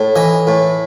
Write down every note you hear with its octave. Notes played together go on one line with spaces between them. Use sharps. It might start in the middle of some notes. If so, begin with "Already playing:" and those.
Already playing: A2
E3 D#5
A2